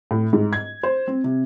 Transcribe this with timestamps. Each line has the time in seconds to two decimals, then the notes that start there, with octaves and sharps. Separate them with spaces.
0.11 A2
0.33 G#2
0.53 G#6
0.83 C5
1.08 C4
1.24 C3